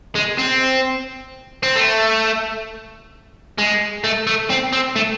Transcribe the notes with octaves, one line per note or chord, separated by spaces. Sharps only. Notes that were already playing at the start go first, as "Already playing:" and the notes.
G#3
C4
C4
A3
G#3
A3
A3
C4
C4
A3